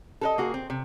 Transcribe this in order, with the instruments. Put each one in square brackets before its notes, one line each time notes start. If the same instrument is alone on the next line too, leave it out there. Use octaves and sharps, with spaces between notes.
[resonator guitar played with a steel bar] A4 A#4 D#5
A#3 F#4 G#4
C4
C3